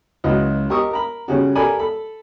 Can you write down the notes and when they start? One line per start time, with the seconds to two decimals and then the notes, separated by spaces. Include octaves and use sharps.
0.24 C#2 F#3 E4 F#4 B4 D#5
0.70 G4 A#4 D#5 C#6 D#6 E6
0.92 A#4 A#5 B5
1.28 C#3 G3 C#4 F#4
1.55 G4 A4 A#4 D5 G#5 B5
1.79 A4 B5